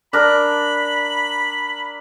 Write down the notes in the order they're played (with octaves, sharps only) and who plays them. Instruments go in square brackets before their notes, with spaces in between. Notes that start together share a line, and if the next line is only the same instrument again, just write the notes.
[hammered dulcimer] D4 A#4 [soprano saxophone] B5